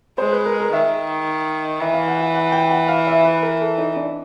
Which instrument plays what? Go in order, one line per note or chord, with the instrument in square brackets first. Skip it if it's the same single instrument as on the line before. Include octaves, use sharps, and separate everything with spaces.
[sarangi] G#3 [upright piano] C5
[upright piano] B4
A#4
A#4
[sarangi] D#3 [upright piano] E5
[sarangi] E3 [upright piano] E5
[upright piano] F5
F#5
F#5
F#5
G5
F#5
F5
E5
B4
A#4
A4
D#4
D4